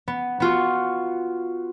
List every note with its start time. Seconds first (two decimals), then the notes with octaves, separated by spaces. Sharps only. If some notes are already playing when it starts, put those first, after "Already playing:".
0.08 B3
0.40 B3 F4 F#4